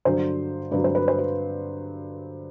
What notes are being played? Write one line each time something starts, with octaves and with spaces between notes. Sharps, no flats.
G2 D3 F#3 C5
G2 D3 F#3 B4
C5
B4
C5
B4